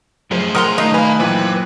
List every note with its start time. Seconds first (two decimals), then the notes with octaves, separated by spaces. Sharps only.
0.31 F#2 A2 F3 G#4 C5
0.55 B1 A#4 F#5 A#5 C6 D#6
0.78 D#3 A3 D#4 F4
0.94 B4 F5 G#5 A#5
1.20 F#2 A#2 E3 B4 C5 G5